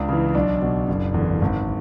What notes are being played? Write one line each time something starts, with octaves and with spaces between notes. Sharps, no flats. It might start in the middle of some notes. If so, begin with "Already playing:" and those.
Already playing: C#2 D4
C#3 E3
B1 D4
B2
F#1
E2 D3
G#1